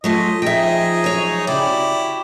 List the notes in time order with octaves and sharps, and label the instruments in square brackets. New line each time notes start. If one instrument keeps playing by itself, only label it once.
[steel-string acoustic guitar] F#3 A3 G#4 [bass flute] F4 [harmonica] D#5
[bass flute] F3 [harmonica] D#4 G#4 D#5 [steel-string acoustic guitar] E5 G5
[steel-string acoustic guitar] F#3 C#5
[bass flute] C#3 [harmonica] E4 G4 [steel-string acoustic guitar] D5
[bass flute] F#4